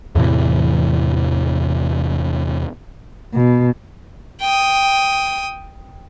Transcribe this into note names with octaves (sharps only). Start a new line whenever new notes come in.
E2 A2 C3 E3
B2
G5 D#6